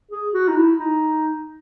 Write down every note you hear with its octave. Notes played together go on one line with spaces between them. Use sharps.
G#4
F#4
D#4
E4
D#4